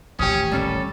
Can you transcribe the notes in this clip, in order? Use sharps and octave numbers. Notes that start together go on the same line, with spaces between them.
D#1 A1 F3 C#4 G4 D#6
G3 C#4 A4 C#5